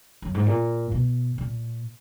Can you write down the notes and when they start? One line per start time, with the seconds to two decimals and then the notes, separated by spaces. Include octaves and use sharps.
0.22 F#2
0.34 G#2
0.46 A#2
0.92 B2
1.38 A#2